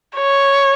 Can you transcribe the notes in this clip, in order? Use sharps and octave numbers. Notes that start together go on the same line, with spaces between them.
C#5